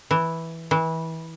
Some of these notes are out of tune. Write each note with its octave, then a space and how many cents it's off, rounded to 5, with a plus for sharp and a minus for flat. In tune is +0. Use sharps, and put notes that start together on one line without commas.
E3 -5
E3 -25